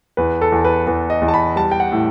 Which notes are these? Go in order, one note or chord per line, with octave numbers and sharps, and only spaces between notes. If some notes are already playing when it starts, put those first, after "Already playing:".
E2 B4
A4
E2
B4
E2 B4
D#5
E2
A5
B5
G3 A5
G5
F#5
A2